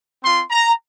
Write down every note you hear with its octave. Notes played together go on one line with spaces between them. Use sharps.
C4 F4 C6
A#5